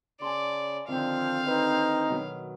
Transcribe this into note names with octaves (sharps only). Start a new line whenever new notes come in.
C#3 D5 G#5 A5 C6
D3 D#3 F3 C4 F5
D#4 B4
B2 D#3 F#3